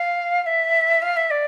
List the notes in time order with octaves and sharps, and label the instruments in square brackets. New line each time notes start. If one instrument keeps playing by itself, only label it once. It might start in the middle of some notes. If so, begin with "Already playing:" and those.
Already playing: [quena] F5
F5
E5
F5
E5
D5